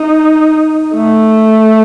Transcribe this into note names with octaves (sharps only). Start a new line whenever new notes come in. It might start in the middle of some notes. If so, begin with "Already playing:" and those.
Already playing: D#4
A3